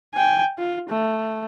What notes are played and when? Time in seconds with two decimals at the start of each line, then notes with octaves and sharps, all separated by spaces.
0.14 G5 G#5
0.59 F4
0.89 A3